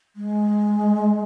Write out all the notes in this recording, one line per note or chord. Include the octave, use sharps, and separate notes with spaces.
G#3